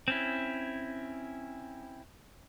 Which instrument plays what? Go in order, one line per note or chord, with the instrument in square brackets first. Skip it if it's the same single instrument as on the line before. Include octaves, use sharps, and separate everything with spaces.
[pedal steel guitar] C4 C#4 E4